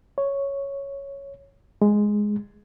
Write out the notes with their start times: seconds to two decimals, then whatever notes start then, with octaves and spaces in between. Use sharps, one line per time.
0.18 C#5
1.82 G#3